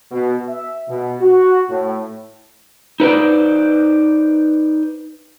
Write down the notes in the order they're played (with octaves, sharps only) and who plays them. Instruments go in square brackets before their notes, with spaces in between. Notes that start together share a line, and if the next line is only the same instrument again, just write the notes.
[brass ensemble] B2
E5
B2
F#4
A2
[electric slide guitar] D#4 B4 C5 D5